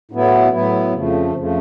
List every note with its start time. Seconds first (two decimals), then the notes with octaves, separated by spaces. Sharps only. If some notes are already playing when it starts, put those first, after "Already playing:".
0.11 A2 F#3 B3 E4
0.53 A2 F#3 B3 E4
0.94 F2 C#3 F3 A3
1.35 F2 C#3 F3 A3